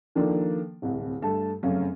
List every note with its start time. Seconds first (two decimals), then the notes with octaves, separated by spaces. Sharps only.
0.15 D#3 F3 A#3 D4 A4
0.82 D1 C2
1.22 G2 A3 A5
1.63 F1 F#2 C#3 A3 C#4 F5